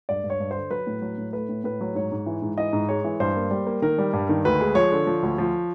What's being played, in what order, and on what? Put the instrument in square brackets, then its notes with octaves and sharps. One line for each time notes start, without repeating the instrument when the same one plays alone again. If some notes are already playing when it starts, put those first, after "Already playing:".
[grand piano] G2 D5
G2
C#5
G2
D3 C5
F#3 B4
A2
F#3
A2
A3 B4
A2
A2 B4
F#3
G#2 C#5
G#2
E3
G#2
E3 D#5
G#2
G#3 C#5
E3
G2 C5
A#3
G3
A#3
D#3 A#4
G3
G2
D#3
D2 B4
G#3
F3 C#5
D3
F3
D2
F3